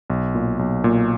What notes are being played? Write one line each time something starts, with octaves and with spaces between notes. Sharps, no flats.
B1
A#2
B1
A#2